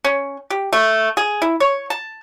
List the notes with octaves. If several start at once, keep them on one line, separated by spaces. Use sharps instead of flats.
C#4
G4
A3
G#4
E4
C#5
A5